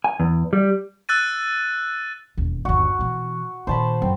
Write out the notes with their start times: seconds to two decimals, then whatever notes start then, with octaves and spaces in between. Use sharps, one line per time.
0.04 G#5
0.20 E2
0.53 G3
1.09 E6 F#6 A6 D#7
2.37 E1 D#2
2.65 G1 D#2 F#4
2.99 B2 E3
3.67 A#2 D#3 C5 A5 B5
4.02 F#2 C4